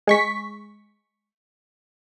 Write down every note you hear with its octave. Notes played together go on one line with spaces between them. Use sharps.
G#3 C#6 B6